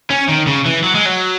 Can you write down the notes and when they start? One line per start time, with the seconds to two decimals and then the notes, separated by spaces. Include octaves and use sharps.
0.10 C#4
0.29 D#3
0.47 C#3
0.66 E3
0.84 F#3
0.95 G#3
1.06 F#3